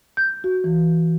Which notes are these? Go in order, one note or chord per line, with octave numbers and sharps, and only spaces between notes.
G6
F#4
E3